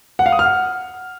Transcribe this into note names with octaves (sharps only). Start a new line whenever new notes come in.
F#5
F5
D#6
F6
F#5